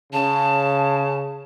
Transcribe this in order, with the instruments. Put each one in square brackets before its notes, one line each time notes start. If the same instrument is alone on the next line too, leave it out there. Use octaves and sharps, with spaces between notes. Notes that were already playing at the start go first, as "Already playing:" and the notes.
[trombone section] C#3 [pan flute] A5